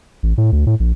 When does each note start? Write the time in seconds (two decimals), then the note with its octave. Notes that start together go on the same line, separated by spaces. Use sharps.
0.23 A1
0.38 A2
0.52 D2
0.67 A2
0.80 A#1